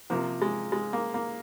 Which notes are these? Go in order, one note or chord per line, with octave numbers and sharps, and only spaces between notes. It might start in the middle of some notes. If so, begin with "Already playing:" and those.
C3 F3 A#3
G#3
G#3
A#3
A#3